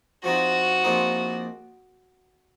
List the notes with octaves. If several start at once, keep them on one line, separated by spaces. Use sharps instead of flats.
F3 C4 D#4 F#4
A#1 A#2 F3 C4 D#4